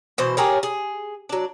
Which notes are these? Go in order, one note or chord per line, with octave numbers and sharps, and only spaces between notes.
B2 E3 C5
G4 G#4 A#4 C#5
G#4
F#3 D4